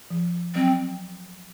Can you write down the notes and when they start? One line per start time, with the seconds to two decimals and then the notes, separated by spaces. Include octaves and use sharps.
0.10 F3
0.55 F#3 C4